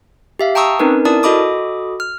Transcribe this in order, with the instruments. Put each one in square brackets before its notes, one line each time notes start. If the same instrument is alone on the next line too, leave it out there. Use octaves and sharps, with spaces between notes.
[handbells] G4 E5 F5
G5 A5 A#5 C#6 D#6 E6
C4 C#4 D#4 A#4 B4
E4 A#4 D5 A5 D#6
F#4 A4 D#5 B5 D6 D#6
F6